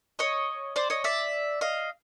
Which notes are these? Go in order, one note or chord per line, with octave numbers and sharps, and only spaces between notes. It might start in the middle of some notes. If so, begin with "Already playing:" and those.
C#5 D#5
C5 D5
C#5 D#5
D5 E5
D#5 F5